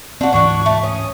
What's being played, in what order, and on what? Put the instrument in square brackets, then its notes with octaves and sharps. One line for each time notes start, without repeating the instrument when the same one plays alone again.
[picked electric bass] C4 [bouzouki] D4 F#4
[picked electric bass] D1 G#2 E3 [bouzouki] D4 F#4 [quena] C#6
[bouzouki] A3
[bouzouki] C#4 [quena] D#6